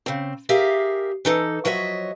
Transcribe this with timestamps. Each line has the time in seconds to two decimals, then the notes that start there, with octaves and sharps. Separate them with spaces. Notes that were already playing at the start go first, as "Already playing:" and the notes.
0.06 C#3 C4
0.49 G4 G#4 A#4 E5 F5
1.25 E3 D#4 A4
1.65 F3 F#3 C#5 D#5 E5